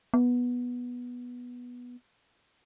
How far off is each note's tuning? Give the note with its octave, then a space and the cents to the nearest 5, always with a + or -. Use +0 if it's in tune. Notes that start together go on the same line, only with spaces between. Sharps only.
B3 -10